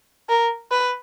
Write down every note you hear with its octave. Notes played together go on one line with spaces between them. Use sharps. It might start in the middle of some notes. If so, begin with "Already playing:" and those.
A#4
B4